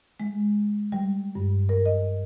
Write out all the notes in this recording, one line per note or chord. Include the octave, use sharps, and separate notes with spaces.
G#3
G3
G2
A#4
D#5